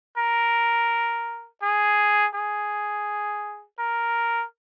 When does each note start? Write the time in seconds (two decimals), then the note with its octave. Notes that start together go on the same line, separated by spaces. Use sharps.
0.17 A#4
1.62 G#4
2.34 G#4
3.79 A#4